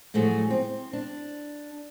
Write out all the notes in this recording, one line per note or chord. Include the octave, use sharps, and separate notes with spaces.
A2 F3 F#3 A3 G#4
C4
D4